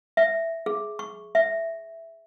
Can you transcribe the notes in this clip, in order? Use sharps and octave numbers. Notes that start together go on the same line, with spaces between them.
E5
G#4
C#6
E5